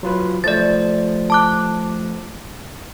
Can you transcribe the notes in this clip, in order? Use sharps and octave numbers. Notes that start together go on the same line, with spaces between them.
F#3 F4 B4
F3 A3 D5 A6
A5 D6 F#6